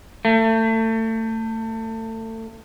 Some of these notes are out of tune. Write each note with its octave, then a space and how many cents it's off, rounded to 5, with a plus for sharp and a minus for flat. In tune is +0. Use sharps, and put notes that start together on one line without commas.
A3 +30